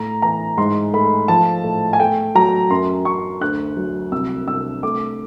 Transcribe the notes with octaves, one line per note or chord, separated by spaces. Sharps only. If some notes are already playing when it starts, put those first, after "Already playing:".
Already playing: A2 A#5
E3 A#5
G#2 C6
A3 B5
F3 A5
A2
G#5
A3 G5
F#3 A#5
F#2 C6
F#2 C#6
D2 F#6
F#3
C2 E6
C2 E6
A3 D6